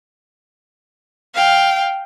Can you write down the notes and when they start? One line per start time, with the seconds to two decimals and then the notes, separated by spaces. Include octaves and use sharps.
1.35 F5 G5